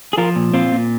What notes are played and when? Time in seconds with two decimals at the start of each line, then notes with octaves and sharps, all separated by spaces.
0.13 G#4
0.18 F3 F4 A#4
0.36 A#2
0.53 A#2 C4 F4
0.72 A#2